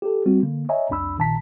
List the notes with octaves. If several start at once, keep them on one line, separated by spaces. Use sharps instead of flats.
G4 A4
G3 C4 F#4
D3 A#3
C#5 D#5 E5 G#5 A#5
C2 F2 D4 B5 E6
A#1 A#2 D#3 A5 A#5 B6